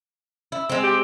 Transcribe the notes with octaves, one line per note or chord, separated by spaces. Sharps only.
E4
G#3 C4
G4